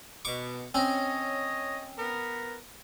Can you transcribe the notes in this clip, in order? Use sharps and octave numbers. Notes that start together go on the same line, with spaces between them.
B2 C#6 D6
C4 C#4 C#5 D#5
B3 A#4